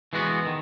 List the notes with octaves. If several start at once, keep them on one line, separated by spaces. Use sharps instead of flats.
E3 G#3 B3 F#4
D#3